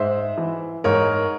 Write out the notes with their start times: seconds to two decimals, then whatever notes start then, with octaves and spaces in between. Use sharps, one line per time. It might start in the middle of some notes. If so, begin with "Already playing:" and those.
Already playing: G#2 C5 E5
0.38 E3
0.84 G#2 A#4 C#5